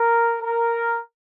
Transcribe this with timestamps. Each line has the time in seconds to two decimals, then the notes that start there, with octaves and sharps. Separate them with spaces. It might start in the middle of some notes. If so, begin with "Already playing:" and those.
Already playing: A#4
0.42 A#4